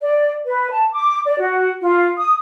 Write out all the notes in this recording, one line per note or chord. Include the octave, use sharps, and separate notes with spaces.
D5
B4
A5
D6
D5
F#4
F4
D#6